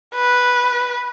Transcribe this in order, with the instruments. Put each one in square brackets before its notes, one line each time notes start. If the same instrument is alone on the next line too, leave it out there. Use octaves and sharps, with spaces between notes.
[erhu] B4